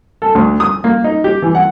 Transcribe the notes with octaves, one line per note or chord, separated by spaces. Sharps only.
A4
D2
D#6
A#3
D#4
G4
E3
F#5